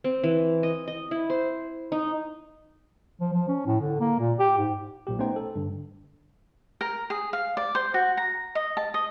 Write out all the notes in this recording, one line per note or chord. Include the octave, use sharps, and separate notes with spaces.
C4
E3
D#5
D#5
E4
C5
D#4
F3
F3
C#4
A2
D3
A#3
A#2
G4
G#2
B1 A#2 G4
A3 B3 C#4 D#4 C5 G5
A4
G2 D3
A#4
G#4
F5
D5
C5
F#4
A#5
D#5
A5
D#5